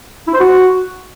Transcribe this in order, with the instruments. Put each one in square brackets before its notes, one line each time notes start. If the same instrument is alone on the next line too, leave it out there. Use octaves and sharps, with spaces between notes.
[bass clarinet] E4
C5
F#4